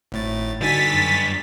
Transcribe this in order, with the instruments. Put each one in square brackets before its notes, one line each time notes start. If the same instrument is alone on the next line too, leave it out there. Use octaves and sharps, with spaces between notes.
[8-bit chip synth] G#1 A2 A6
[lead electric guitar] G2 G#5 [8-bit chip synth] D3 [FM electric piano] D4 D#4 F#4 [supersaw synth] A6 B6
[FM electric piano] F#2